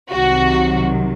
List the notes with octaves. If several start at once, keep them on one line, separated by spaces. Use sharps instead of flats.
C2 C3 D#3 F#3 F#4